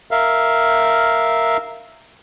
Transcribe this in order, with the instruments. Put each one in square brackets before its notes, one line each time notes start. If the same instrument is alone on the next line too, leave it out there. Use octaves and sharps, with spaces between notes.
[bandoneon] A#4 E5 F5